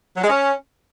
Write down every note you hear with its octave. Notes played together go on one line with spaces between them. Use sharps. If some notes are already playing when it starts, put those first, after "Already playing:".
F#3
G#3
C#4